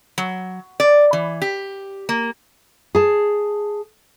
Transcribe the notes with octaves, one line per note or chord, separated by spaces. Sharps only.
F#3
D5
E3
G4
A#3
G#4 A5